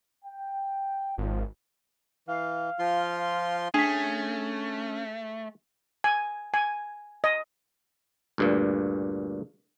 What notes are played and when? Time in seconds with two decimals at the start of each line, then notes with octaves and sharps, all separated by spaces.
0.25 G5
1.18 G#1 C#2 D#3 F3
2.28 E3 F5
2.79 F3 F4 C6
3.74 A3 C#4 D4 G#4 B6
6.04 G#5
6.54 G#5
7.24 D#5
8.38 D2 G2 A#2